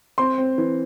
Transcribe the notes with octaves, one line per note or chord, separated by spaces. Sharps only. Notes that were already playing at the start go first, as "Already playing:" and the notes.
C4 C6
C4
E3